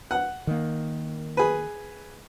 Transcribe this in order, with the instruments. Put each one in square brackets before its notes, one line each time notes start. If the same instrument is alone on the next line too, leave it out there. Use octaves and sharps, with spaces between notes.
[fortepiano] F#5
[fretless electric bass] D#3 A#3
[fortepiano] G#4 B4